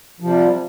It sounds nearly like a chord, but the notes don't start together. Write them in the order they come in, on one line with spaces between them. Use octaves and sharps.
F3 C3 G3